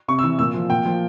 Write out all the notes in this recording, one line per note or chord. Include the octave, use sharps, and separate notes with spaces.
C3 C#6
E3 E6
A#2 E6
F3
A#2 G5
F3